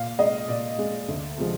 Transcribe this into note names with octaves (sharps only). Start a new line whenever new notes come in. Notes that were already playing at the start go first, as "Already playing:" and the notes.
Already playing: A#2 F5
G#3 D#5
A#2 D5
G#3
D2
C3 F3 G#3